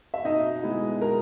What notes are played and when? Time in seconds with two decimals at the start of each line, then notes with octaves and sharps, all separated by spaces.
0.14 E5
0.25 B2 D#4 D#5
0.63 G#3 B3 E4
1.01 B2 A#4